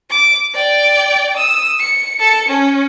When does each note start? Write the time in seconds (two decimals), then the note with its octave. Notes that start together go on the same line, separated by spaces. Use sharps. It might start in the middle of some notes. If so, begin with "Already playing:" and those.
0.10 D6
0.54 D5 G5
1.37 D#6 E6
1.80 C#7
2.20 A4 C#7
2.49 C#4